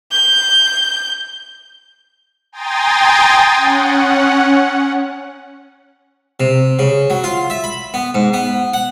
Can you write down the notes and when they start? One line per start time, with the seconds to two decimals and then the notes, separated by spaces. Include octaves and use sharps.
0.12 G6
2.52 G5 G#5 A#5 C6 D#6 A6
3.55 C#4 F#5
6.40 C3
6.79 C#3
7.10 F#3
7.24 F4
7.50 E5
7.64 B5
7.94 B3
8.15 G#2
8.34 B3
8.73 F#5